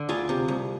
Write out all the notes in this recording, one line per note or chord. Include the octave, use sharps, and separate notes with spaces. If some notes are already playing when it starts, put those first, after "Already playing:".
Already playing: D3
D2 F4 G#4
C3
C2